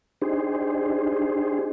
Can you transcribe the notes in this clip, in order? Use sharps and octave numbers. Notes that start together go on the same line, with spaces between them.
D4 D#4 G4 G#4 C5